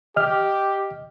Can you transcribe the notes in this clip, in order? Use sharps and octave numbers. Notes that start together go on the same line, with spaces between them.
G4 D#5 F6